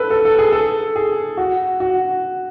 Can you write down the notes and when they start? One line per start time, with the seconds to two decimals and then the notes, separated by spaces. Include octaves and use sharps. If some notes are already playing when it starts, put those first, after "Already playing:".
Already playing: A4 B4
0.10 A4
0.25 A4
0.39 G#4
0.52 A4
0.96 G#4
1.37 F#4
1.80 F#4